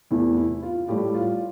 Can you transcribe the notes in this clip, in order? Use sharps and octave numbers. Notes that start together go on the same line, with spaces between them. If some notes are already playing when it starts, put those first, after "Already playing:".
E2 C3 E3 A3 E4
E4
F4
A2 G3 G4
F4